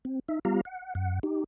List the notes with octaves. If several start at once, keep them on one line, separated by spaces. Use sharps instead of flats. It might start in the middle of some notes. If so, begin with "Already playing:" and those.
C4
D#4 E5
G3 B3 F4 G4 F5 A#5
F#5
F#2 F#5
D#4 G4